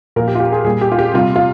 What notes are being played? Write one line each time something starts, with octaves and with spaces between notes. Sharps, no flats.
A#2 F3 A#4
G4
F4
G4
G#4
A#2 G3 G#4
G4
F4
G4
C3 G3 F4
F4